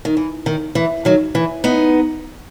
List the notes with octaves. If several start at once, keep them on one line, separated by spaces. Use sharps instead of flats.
D#3
E3
D#3
E3
D#3 F#3
E3
B3 D#4